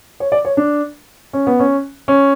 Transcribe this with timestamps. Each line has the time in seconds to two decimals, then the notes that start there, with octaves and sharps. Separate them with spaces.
0.20 C#5
0.32 D5
0.45 C#5
0.57 D4
1.33 C#4
1.47 B3
1.60 C#4
2.08 C#4